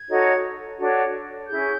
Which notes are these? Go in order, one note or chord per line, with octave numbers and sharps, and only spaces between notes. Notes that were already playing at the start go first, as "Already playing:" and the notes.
Already playing: G#6
D#4 F#4 A4 C#5
D4 F#4 A4 C#5
C#4 E4 G#4 G6